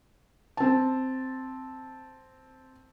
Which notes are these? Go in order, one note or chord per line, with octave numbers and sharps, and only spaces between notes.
C4 A5